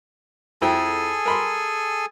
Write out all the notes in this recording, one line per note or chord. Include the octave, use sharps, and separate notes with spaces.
F2 E4 G#4 A4 G5 G#5
A#4 B5 C6